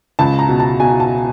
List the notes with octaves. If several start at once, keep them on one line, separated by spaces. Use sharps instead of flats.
C#2 A5
A#5
B2
A5
B2 G#5
A5